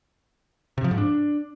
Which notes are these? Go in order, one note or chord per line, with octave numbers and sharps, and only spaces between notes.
C3
F3
G#2
D4